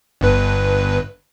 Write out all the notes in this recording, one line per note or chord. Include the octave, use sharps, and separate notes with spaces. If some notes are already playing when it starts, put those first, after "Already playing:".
G1 G2 B4